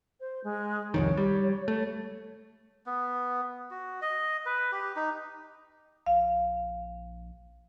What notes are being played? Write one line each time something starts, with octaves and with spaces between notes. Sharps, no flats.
C5
G#3
C2 F2 D#3 C#5
G3
A3
B3
F#4
D#5
B4
G4
D#4
A#1 F5